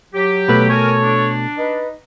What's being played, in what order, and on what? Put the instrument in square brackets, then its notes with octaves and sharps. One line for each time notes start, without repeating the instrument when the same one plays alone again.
[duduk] F#3 [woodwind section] G4
[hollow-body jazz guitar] B2 A3 [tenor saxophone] B4
[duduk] A4 [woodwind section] A#4 G#5 [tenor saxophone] C#5
[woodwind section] D4
[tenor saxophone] D#4 [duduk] B4